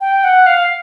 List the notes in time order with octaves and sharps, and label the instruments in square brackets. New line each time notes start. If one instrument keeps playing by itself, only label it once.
[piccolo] G5
F#5
F5